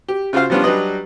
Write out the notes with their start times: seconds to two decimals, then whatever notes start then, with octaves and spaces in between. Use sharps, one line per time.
0.09 G4
0.33 C#3 F4 F#4 C5 F5
0.50 F3 G3 B3 C#4 D4 F4
0.64 F#3 G3 D4 B4 D#5